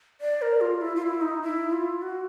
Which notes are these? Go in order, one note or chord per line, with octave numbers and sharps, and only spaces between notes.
D5
A#4
F4
E4
F4
E4
D#4
E4
F4
F#4